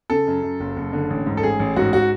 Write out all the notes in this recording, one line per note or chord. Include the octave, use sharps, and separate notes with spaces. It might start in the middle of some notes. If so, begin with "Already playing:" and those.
C#3 A4
F#2
F#2
F#1
F#1
D3
A1
G#2
A4
A1 G#4
A1
G#2 F#4
F#4